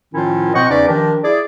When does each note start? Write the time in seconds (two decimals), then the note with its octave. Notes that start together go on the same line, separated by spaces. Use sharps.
0.14 A2 D#3 F3 C#4 E4 F4
0.54 B2 C4 C5 D#5 F#5 C#6
0.69 E2 C#3 C#4 D#4 B4 D5
0.87 D#3 F3 D4 G4 A#4
1.23 E4 G#4 D5